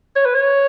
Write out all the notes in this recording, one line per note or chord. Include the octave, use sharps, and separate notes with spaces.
C#5
B4
C#5